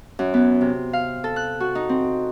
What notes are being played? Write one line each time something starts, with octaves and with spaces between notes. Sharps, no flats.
F#2
B3
C3
F5
A4
F#6
F#4
D#4
C4